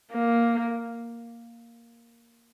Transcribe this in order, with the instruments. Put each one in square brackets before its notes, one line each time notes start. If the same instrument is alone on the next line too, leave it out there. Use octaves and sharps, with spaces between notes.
[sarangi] A#3